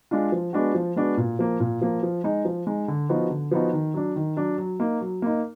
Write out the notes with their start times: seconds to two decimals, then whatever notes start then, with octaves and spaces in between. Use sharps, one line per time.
0.11 G#3 D4 F4
0.32 F3
0.53 G#3 B3 D4 F#4
0.74 F3
0.96 G#3 B3 D4 F#4
1.17 A#2
1.39 F3 A#3
1.60 A#2
1.81 F3 A#3
2.03 F3
2.24 G#3 D#4
2.45 F3
2.67 G#3 D#4
2.88 D3
3.09 F3 B3 D#4 F#4
3.30 D3
3.51 F3 B3 D#4 F#4
3.73 D#3
3.94 F#3 D4
4.16 D#3
4.37 F#3 D4
4.58 F#3
4.80 A#3 D#4
5.01 F#3
5.22 A#3 D#4